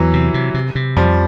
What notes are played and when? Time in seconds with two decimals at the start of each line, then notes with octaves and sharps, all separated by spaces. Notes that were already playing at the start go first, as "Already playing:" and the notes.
Already playing: E2 E3 F#3
0.13 C3
0.34 C3
0.54 C3
0.75 C3
0.96 F2 F3 G3